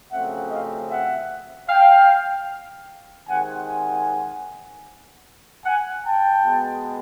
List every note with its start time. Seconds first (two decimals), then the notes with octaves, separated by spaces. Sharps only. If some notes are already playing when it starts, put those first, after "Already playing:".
0.11 F#2 C#3 F3 A3 C4 E5 F#5
0.51 D#5 F5
0.91 E5 F#5
1.69 F5 G5
3.28 C3 D#3 G#3 C4 F#5 G#5
3.67 F#5 G#5
5.64 F#5 G#5
6.04 G5 A5
6.43 B2 G#3 B3